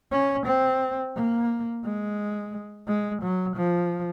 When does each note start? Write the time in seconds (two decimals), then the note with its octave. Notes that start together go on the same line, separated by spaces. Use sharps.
0.12 C#4
0.46 C4
1.16 A#3
1.84 G#3
2.87 G#3
3.22 F#3
3.56 F3